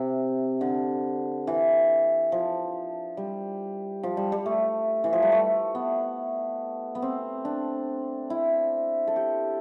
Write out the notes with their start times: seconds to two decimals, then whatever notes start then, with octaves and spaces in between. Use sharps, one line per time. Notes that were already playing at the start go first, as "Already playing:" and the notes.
Already playing: C3
0.61 D3
1.47 E3
2.32 F3
3.17 G3
4.03 F3
4.17 G3
4.32 G3
4.46 A3
5.04 E3
5.13 F3
5.23 G3
5.32 A3
5.75 B3
6.95 B3
7.02 C4
7.45 D4
8.30 E4
9.08 A4
9.16 G4